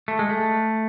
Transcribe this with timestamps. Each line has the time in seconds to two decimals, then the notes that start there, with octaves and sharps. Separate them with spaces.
0.08 A3
0.19 G#3
0.29 A3